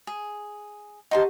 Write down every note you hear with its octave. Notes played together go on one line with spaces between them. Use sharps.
G#4
D#4 G4 C5 F#5 A5